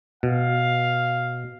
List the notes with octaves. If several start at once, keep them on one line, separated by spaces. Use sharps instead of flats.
B2 F5